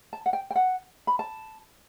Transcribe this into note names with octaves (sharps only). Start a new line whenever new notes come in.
A5
F#5
G5
G5
F#5
B5
A5